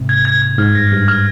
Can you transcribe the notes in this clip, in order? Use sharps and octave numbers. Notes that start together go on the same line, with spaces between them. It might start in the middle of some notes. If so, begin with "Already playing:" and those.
Already playing: G#2 C3
G#6
G#6
G#6
G#2 F6
G2 A#6
G2 A#6
F6